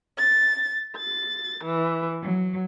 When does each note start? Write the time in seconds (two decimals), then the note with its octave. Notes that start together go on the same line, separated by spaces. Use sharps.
0.17 A6
0.97 A6
1.65 E3
2.23 F#3